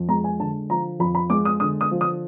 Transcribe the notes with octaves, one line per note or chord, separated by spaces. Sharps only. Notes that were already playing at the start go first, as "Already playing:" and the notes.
Already playing: F2
G#3 A#5
G#5
D3 A5
F3 A#5
F2 B5
B5
G#3 D6
D#6
D3 D#6
D#6
F3
D#6